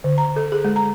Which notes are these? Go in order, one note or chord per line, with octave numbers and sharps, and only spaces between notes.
D3
A#5
A4
G#4
G#3
A#5